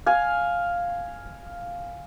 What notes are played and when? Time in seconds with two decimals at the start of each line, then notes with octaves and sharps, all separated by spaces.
0.06 F5 G#5